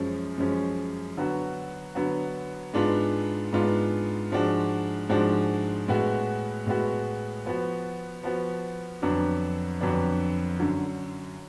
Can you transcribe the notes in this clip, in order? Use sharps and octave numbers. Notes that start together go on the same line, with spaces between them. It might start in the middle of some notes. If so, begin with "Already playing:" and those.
Already playing: F#2 F3 G#3 C#4
F#2 F3 G#3 C#4
D3 F#3 B3 F#4
D3 F#3 B3 F#4
G#2 G#3 B3 D4 F4
G#2 G#3 B3 D4 F4
G#2 F3 G#3 D4 F#4
G#2 F3 G#3 D4 F#4
A2 G#3 B3 F#4
A2 G#3 B3 F#4
F3 B3 F#4
F3 B3 F#4
F2 D3 F#3 B3 D4
F2 D3 F#3 B3 D4
F#2 D3 F#3